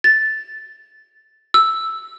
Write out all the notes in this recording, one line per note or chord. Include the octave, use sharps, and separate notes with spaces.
A6
E6